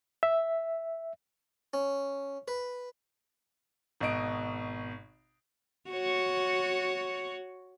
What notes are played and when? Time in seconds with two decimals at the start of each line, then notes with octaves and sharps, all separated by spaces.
0.23 E5
1.73 C#4
2.48 B4
4.00 G#1 B2 D#5 D7
5.90 F#4 C#5